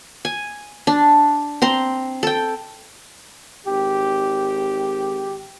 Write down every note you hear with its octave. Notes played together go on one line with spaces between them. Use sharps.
G#5
D4
C4 A#5 C6
A4 G5
G#1 G4